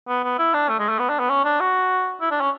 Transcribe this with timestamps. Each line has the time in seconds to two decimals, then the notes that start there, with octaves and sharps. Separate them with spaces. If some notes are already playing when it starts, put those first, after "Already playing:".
0.08 B3
0.24 B3
0.38 E4
0.54 D4
0.69 A3
0.79 G#3
0.89 A3
0.99 B3
1.10 D4
1.20 B3
1.30 C#4
1.45 D4
1.60 F#4
2.21 E4
2.31 D4
2.41 C#4